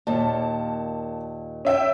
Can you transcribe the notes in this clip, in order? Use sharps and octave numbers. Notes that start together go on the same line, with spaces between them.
D#2 A#2 A5
C#4 E5 G5